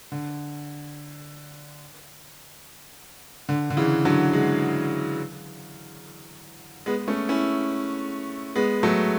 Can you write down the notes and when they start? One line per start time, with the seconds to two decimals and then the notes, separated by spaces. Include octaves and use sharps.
0.12 D3
3.49 D3
3.70 D3
3.77 C#3 E3
4.05 D3 F#3
4.33 E3 G#3
6.86 G#3 B3
7.08 A3 C#4
7.29 C#4 E4
8.56 G#3 B3
8.83 F#3 A3